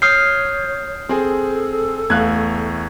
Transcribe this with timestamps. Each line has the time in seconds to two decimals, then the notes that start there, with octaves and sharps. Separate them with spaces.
0.02 C#5 D#6 F6 G6 C7
1.09 C4 G#4 A4
2.10 E2 A3 F5 F#6 G#6